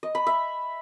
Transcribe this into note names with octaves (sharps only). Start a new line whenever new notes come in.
D#5
B5
E5